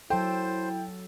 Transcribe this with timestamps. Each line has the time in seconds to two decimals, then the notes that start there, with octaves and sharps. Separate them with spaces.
0.10 F#3 E4 A4 C5 G5